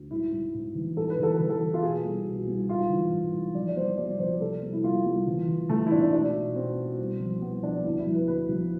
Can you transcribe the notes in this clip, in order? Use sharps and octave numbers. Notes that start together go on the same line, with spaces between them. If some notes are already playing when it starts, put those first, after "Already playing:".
Already playing: D2
G#2 E4
G#2
G#2
E3
G#2 A4
B4
E3
A4
E3 B4
A4
E3
F4
B2 G#4
C2
B2
C2
G#2 F4
E3
G#2
G#2
F3 D5
D5
C2 C5
C2 D5
F3 C5
C3 A4
C2
E4
C2 F4
C2
E3
E3
E3 A3
E4
G#2 D4
D4
B2 D4
B2
B2 C4
B2
C2
F3
C2 B3
F3 D4
D2 E4
E4
F3
B4
D2 B4
F3